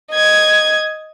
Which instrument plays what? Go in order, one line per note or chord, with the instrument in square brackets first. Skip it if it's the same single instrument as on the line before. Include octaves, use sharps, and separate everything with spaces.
[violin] D#5 G#6